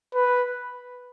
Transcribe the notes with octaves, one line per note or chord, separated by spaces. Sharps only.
B4